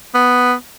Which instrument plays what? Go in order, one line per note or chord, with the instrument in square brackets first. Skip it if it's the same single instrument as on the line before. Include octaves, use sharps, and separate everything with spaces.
[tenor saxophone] B3